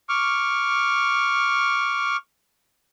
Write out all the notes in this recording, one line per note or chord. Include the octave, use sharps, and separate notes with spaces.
C#6 D6 F6